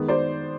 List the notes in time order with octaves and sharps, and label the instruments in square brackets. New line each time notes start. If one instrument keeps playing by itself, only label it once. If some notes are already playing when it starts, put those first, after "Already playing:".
Already playing: [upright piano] D#3 G#3 B3
C5 D5